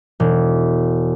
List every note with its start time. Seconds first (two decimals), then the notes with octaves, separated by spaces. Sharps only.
0.20 E1